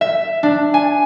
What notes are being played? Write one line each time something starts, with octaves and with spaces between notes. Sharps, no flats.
E5
D4
G#5